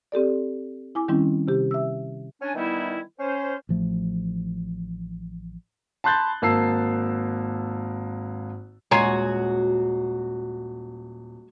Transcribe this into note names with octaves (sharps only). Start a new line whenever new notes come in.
C4 G4 A4 D5
E4 G#5 D6
D#3 G3 C4 C#4 E4
C3 G4
E5 E6
C#4 D4 G#5
D#3 E3 G3 B3 D#4 E4
C#4 C5
A1 F3 A3
A5 B5 C6 F#6 G6 A6
G#1 A#3 A5 E6 C7
D#1 G#3 F#4 C#5 G#5 A#5 C7